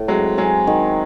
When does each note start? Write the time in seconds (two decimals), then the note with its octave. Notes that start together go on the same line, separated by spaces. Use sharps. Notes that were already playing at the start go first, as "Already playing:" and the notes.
Already playing: A2
0.08 F#3 G#3 C4
0.37 F#3 G#3 G#4
0.67 D#3